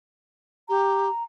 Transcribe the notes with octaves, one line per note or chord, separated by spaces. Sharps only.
G4 A#5